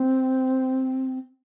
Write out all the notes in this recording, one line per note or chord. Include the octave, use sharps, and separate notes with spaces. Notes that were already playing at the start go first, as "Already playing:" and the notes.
Already playing: C4